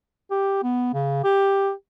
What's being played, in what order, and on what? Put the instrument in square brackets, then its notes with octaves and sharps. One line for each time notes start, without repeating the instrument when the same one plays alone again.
[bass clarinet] G4
B3
C#3
G4